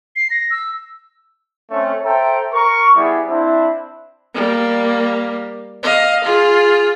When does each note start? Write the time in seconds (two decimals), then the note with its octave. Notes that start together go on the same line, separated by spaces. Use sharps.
0.16 C7
0.30 A#6
0.51 E6
1.71 A3 C4 C#4
2.04 A4 C5 E5 G5 A#5
2.53 A#4 C#6
2.96 G3 B3 E4 G#4 D6
3.29 C4 D4 E4
4.35 G3 A#3
5.83 D#5 F5
6.24 F4 G#4